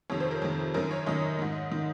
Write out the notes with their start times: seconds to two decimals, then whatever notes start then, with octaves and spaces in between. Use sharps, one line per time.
0.10 F2 C3 D#3 C#5
0.20 C5
0.31 A#4
0.42 F2 C3 D#3
0.74 F#2 D#3 A#4
0.91 C#5
1.07 F#2 D#3 D#5
1.39 G#2 D#3
1.72 D#3